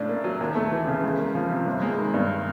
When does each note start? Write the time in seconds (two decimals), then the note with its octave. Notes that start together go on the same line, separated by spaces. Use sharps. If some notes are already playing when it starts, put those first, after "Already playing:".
Already playing: A2 C#3 D4
0.09 A#3
0.24 F#3
0.40 D#2
0.55 A3
0.71 E3
0.87 C#3
1.03 C#2
1.19 A#3
1.35 F3
1.51 C3
1.66 G1
1.82 G#3
1.98 D#3
2.14 G2